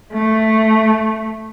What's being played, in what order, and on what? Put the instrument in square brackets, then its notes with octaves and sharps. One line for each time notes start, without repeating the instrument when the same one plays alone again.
[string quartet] A3